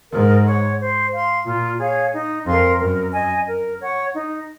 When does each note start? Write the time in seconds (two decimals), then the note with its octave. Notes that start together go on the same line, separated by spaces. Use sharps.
0.12 G#2 A#4
0.46 C#5 F#5 C#6
0.79 C5
1.12 F5 C6
1.46 A#2 F4
1.79 G#4 C#5 F5
2.13 D#4
2.46 F2 A#4 F5 C6
2.79 F#2 A#4
3.13 D#5 G#5
3.47 A#4
3.80 C#5 F#5 C#6
4.13 D#4